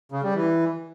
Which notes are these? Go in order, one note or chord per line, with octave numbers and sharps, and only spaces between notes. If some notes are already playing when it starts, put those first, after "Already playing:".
C#3
G3
E3